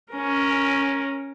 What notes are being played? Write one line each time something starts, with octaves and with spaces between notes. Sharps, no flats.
C#4 A#4